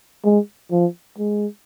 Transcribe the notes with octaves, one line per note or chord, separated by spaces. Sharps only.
G#3
F3
G#3